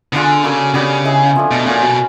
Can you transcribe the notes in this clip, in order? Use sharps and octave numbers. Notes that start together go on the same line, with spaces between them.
D3 B3 D4 F4 G#4
C#3 A#3 D4 F#4 A4
C#3 G3 B3 D4 G4
E4 G#4 B4 D#5
F3 A3 D4
B2
A#2 C#4 F#4 A#4
B2